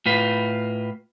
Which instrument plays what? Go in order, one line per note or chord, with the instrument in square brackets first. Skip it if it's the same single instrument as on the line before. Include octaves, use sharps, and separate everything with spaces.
[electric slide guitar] A2 F4 B4